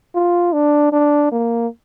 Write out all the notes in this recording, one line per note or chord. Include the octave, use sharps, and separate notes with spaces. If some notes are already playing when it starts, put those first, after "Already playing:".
F4
D4
D4
A#3